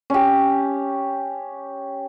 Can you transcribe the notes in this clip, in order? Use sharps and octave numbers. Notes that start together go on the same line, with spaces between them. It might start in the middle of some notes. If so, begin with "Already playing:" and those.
C#4 G4